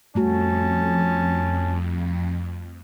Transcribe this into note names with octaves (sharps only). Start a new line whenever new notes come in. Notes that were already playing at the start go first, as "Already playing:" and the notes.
F2 G3 A3 C#4 F#4 A5